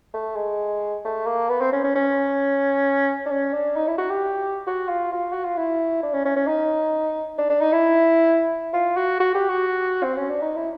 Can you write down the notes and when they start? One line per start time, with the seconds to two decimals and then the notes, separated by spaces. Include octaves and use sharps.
0.14 A3
0.36 G#3
1.05 A3
1.26 A#3
1.49 B3
1.61 C4
1.72 C#4
1.84 C#4
1.96 C#4
3.26 D4
3.31 C#4
3.53 D4
3.76 D#4
3.88 E4
3.98 F#4
4.10 G4
4.67 F#4
4.89 F4
5.12 F4
5.33 F#4
5.45 F4
5.57 E4
6.03 D4
6.13 C#4
6.25 C#4
6.36 C#4
6.47 D#4
7.39 D4
7.50 D4
7.61 D#4
7.73 E4
8.74 F4
8.97 F#4
9.20 F#4
9.35 G4
9.49 F#4
10.03 C4
10.17 C#4
10.30 D4
10.42 D#4
10.56 E4